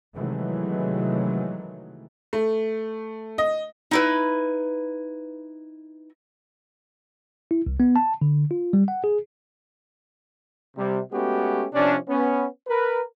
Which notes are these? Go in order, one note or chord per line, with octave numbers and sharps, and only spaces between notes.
C3 D#3 E3 F#3 G#3 A3
A3
D#5
D#4 E4 B4
E4
C2
B3
A5
D3
F4
G3
F#5
G#4
C3 G3
G#3 A3 B3 C#4 F#4 G4
C3 F3 C#4 D4
B3 C#4
A#4 B4